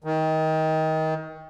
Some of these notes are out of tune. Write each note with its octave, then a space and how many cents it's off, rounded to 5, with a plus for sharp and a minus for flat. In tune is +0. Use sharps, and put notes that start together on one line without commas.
D#3 +25